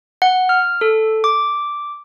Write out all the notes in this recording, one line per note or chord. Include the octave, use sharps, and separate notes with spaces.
F#5
F6
A4
D6